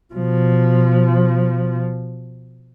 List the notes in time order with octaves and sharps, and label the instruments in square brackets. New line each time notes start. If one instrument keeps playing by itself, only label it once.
[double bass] B2 F3